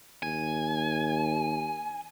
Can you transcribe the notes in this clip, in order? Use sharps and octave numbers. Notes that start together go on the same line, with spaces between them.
D#2 G#5